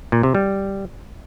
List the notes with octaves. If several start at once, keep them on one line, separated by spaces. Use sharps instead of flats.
A#2
C3
G3